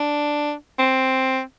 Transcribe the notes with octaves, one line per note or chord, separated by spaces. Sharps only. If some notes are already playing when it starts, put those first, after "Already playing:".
Already playing: D4
C4